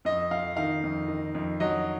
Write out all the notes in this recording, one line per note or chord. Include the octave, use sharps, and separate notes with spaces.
F2 D#5
F2 F5
D#3 F5
F2
D#3
F2
F#3 D#5